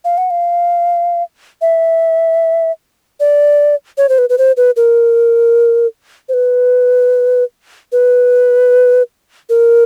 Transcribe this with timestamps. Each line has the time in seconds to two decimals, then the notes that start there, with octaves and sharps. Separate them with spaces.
0.05 F5
0.18 F#5
0.30 F5
1.62 E5
3.20 D5
3.98 C#5
4.09 C5
4.18 B4
4.30 B4
4.38 C5
4.57 B4
4.76 A#4
6.29 C5
6.34 B4
7.92 B4
9.49 A#4